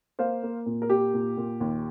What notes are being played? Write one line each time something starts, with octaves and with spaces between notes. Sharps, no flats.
A#3 C5 F5
A#3
A#2
A#4
A#3 G4
A#2
A#2
D#2